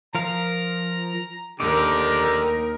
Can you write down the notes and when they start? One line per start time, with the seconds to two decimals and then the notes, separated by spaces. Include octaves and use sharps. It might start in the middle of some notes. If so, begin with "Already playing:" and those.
0.15 F3 A#4 F5 A#5
1.60 D#2 D3 D#4 G4 A#4 D6